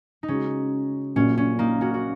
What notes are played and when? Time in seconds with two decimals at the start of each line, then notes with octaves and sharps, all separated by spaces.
0.23 D#4
0.28 C#3 G#3 C#4 F#4
1.16 A#1 A#2 F#3 C#4
1.38 C#4
1.59 A#3 D#4
1.81 C#4 F#4
1.94 F#4